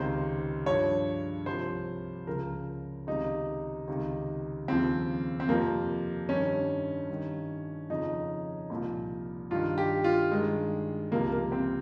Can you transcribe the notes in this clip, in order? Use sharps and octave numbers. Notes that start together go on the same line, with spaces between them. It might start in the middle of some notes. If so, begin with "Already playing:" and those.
Already playing: C#2 C3 D#3 C5
G2 F3 C#5
C2 C3 F3 C5
C#2 C#3 F3 A#4
C#2 C3 D#3 D#4
C#2 C3 D#3
D#2 C#3 F3 C4
C4
F2 C3 F3 A#3
G2 D#3 C#4
G2 D#3
F2 C#3 F3 D#4
C2 A#2 F3
G2 D#3 F4
G4
F4
G2 D#3 G#3
C#2 C3 F3 A#3
A#3
C4